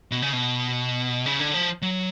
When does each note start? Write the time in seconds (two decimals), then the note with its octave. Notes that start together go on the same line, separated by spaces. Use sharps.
0.11 B2
0.22 C#3
0.33 B2
1.26 C#3
1.40 D3
1.54 F3
1.82 F#3